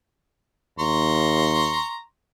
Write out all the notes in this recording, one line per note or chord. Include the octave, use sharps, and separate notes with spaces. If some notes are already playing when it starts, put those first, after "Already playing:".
D#2 A#5 C6 C#6